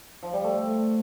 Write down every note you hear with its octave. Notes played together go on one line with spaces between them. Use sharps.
F3
G3
A3